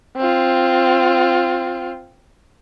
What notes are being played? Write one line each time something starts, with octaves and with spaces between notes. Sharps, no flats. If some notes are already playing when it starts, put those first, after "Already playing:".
C4 F4